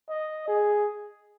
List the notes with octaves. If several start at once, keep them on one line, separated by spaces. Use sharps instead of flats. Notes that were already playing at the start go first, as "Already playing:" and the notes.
D#5
G#4